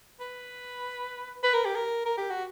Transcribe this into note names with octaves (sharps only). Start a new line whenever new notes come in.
B4
B4
A#4
G4
A#4
A#4
G4
F#4